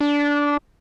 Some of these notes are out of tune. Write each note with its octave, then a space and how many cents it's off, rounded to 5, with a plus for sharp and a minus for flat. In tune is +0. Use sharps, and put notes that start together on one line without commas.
D4 -15